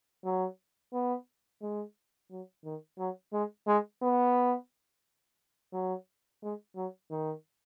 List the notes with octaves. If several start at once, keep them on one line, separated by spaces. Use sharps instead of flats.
F#3
B3
G#3
F#3
D#3
F#3
G#3
G#3
B3
F#3
G#3
F#3
D#3